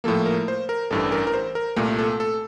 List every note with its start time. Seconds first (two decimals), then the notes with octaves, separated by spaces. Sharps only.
0.04 A2 F3 A#3 A4
0.26 A#4
0.48 C5
0.69 A#4
0.91 A1 G2 E3 A4
1.12 A#4
1.27 A#4
1.33 C5
1.55 A#4
1.76 C2 A#2 A3 A#4
1.99 A4
2.20 A4